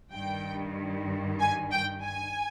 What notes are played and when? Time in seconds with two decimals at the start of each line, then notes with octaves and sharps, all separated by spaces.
0.12 G2 D#3 G5
1.40 G#5
1.71 G5
2.03 G#5